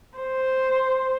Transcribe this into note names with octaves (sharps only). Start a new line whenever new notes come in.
C5